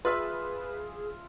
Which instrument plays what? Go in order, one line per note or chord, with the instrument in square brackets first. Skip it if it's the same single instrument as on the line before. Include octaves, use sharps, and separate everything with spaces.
[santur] F4 E5 [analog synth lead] G#4 [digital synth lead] B4